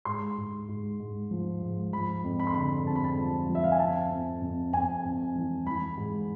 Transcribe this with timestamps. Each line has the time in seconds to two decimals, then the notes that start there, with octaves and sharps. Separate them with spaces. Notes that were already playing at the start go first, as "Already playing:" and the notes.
0.05 G#2 C6
0.37 G#2
0.69 G#2
1.00 G#2
1.31 F3
1.62 G#2
1.93 F3 B5
2.24 F2
2.39 B5
2.47 C6
2.54 D3 B5
2.86 F2 A5
2.96 B5
3.04 A5
3.18 F3
3.49 F3
3.55 E5
3.64 F5
3.72 G#5
3.79 F2 A5
4.10 F2
4.42 F2
4.73 F2 G#5
5.05 F2
5.35 E3
5.67 E3 B5
5.97 G#2